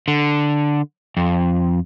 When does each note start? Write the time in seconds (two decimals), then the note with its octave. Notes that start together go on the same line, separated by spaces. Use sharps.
0.08 D3
1.17 F2